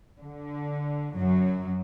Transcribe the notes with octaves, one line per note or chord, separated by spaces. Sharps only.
D3
F#2 F#3